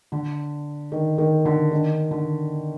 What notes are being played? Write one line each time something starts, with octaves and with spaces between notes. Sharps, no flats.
D3
D#3
D#3
D3
D#3
D3